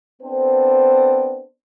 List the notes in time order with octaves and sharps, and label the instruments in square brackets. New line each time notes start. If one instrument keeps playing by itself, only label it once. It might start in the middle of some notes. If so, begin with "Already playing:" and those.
[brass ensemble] B3 C4 D4 A4 C5